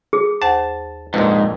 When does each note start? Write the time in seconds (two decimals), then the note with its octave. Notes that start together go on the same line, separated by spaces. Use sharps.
0.13 G#4 D#6
0.42 D#2 C5 F#5 A5
1.14 A#1 F2 G#2 B4